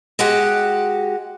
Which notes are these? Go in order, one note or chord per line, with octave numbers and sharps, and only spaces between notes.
G#3 F#4 G4 F#5